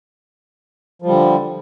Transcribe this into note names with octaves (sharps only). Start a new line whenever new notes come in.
D3 F3 G3